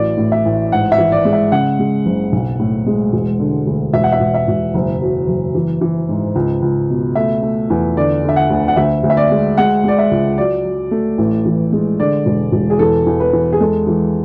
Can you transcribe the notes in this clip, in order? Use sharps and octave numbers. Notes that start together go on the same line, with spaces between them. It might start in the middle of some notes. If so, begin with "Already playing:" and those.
Already playing: A1 F#3 D5
A2
E5
A1
G#2 F#5
E5
E3
D5
G#3
E5
C#3 F#5
G#3
F#1
B1
A2
G#3
E1
D3
D2
E1 E5
F#5
E5
E1
E5
E1
F#1
F#3
F#1
E3
E3
G#2
C#2
C#2
B2
A3 E5
A3
E2
D3 D5
D3 E5
F#5
D2
F#5
D2 E5
D2
E5
D5
G#3
G#3 F#5
G#3 D5
E5
C#2
F#3 D5
F#3
A3
A1
E3
G#3
D3 D5
E1
E1
G#4
E2 A4
E2
B4
E2
G#4
G#3 A4
E3